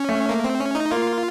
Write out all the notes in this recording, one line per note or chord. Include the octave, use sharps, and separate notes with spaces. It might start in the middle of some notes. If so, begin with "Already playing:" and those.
Already playing: C#4
A3
A#3
C4
C#4
D#4
A#3 F4